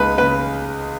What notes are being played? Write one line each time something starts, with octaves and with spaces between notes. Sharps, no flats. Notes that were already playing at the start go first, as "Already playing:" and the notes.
Already playing: C#2 G#3 D#4 B4
C#3 B4